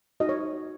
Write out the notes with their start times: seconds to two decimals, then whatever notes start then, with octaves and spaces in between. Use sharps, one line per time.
0.20 D#4 F#4 D#5
0.29 C#5